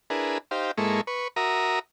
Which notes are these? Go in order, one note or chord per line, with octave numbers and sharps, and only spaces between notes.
D4 E4 G#4 A#4 B4
D#4 G4 C5 F5
G#2 G#3 A#3 E4 A4 C#6
B4 C#6
F#4 A#4 E5 A#5 D#6